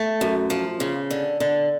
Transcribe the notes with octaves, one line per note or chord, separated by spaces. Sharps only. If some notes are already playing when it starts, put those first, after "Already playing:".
Already playing: A3
F#2
F3
C#3
D3
D3